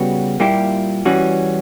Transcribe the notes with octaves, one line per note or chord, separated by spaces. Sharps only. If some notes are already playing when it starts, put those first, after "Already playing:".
Already playing: C#3 G3 B3 F#4
A#2 G3 A#3 E4 G4
E3 G3 C#4 F#4